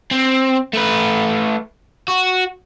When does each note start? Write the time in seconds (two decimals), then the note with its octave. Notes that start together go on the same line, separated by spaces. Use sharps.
0.11 C4
0.73 A3 B4
2.08 F#4